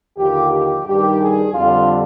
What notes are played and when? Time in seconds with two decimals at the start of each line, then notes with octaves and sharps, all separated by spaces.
0.18 D#2 D3 F3 G4
0.52 G4
0.86 G2 D#3 G3 G4
1.20 G#4
1.55 F2 D3 G3 F4